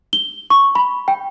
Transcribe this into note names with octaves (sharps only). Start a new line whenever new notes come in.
G7
C#6
B5
G5